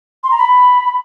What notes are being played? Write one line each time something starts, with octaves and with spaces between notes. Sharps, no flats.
C6
A#5
B5